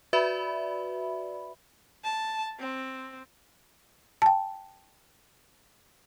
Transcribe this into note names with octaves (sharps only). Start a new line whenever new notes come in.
F#4 B4 D5 E5 B5
A5
C4
G5 A5